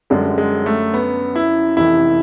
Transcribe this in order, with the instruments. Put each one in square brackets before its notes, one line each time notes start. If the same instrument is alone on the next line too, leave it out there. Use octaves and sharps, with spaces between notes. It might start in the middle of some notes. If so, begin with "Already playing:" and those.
[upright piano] F#2 D3 G3 [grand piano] G#3
[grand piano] G#3
A3
B3
E4
[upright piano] F1 F2 C3 E3 [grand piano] E4